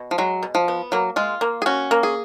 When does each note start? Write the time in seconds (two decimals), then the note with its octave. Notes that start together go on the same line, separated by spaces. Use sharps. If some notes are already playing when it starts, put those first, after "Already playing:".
Already playing: B2
0.11 F3
0.18 F#3 G#3
0.43 B2
0.55 F3
0.68 B3
0.92 F#3 A#3
1.16 G#3 F4
1.41 A#3
1.62 G#4
1.66 C#4 F#4
1.91 A#3
2.03 G#4